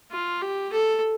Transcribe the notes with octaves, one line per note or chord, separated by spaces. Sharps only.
F4
G4
A4